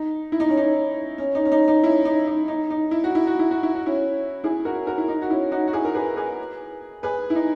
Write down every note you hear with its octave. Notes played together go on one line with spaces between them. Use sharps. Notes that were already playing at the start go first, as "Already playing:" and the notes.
Already playing: D#4
E4
D#4
C#4
D#4
C#4
D#4
C#4
D#4
D#4
C#4 E4
D#4
D#4
D#4
D#4
E4
F#4
E4
F#4
E4
F#4
E4
F#4
C#4 E4
E4 G#4
F#4 A#4
F#4 A#4
E4
D#4
F#4
C#4 E4
D#4 F#4
F#4
E4 G#4
A#4
G#4 B4
G#4 B4
G#4 B4
E4
D#4